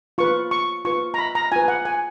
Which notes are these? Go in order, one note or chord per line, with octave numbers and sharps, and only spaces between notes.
F4 B4 C#6
C#6
F4 B4 C#6
A#5
B5
A#5
F4 B4 G#5
F#5
G#5